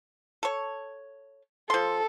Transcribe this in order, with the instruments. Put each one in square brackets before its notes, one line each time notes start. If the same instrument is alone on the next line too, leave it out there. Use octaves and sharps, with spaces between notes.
[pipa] A4 C#5
[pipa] F3 C6 [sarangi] A4